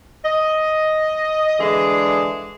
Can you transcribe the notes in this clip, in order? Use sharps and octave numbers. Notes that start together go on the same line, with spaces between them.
D#5
D3 E3 G#3 D4 G#4